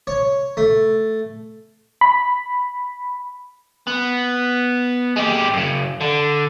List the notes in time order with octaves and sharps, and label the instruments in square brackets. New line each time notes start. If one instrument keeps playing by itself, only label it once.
[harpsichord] C#5
A3
[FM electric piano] B5
[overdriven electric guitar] B3
G#3 G4
F#2 C#3
D3